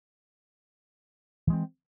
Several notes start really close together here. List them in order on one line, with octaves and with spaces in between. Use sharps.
E3 G#3 C4